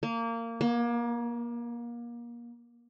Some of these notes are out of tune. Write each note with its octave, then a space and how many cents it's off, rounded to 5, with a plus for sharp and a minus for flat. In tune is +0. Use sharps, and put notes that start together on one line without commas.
A#3 -20
A#3 +30